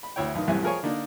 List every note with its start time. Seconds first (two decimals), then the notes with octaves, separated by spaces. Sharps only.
0.03 B5
0.16 D2 E4 C#5 G5
0.35 B1 D#3
0.47 C2 F#2 A2 C3 E3 G#5
0.63 F3 G#4 A#4 C#5 G#5 C#6
0.83 D3 A#3 D4 D#4